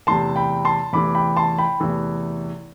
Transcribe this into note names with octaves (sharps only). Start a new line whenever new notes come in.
E2 C3 E3 A3 A5 C6
G5 B5
A5 C6
E2 C3 E3 A3 B5 D6
G5 B5
A5 C6
G5 B5
E2 C3 E3 A3